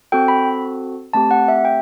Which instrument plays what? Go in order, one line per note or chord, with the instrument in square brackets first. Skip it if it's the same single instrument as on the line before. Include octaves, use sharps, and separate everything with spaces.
[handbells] C4 F#4 A4 G5
B5
A3 C4 G4 A5
F#5
E5
G5